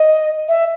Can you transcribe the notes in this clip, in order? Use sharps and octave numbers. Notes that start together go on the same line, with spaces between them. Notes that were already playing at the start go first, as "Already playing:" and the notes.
Already playing: D#5
E5